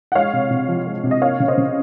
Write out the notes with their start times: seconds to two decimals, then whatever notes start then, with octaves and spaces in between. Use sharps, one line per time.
0.12 F#5
0.15 G#3 C#5 F5
0.33 C3
0.51 C3
0.68 F3
0.87 G#3
1.04 C3
1.11 D#5
1.21 A#3 C#5 F5
1.40 C#3
1.48 C5 D#5
1.58 C#3